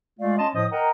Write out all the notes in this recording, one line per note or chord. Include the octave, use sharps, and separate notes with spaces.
G#3 A3 F4 D5 F5
C#4 D#5 A5 C6
A2 F3 D#5 D#6
A#4 D#5 F#5 G5 A#5